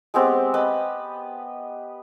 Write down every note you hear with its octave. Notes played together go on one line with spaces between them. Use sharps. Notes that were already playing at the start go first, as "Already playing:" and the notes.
G#3 B3 C4 G4
B4 D#5 A5 B5